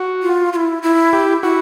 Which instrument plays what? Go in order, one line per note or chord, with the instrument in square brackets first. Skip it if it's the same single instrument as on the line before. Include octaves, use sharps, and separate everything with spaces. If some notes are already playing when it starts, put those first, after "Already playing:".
Already playing: [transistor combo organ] F#4
[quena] F4
F4
E4
E4
[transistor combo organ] G4
[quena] E4 [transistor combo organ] F#4